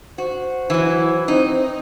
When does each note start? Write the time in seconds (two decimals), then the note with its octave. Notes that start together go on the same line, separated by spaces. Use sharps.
0.18 F#4 C5
0.70 E3 F#3 E4
1.28 C4 D#4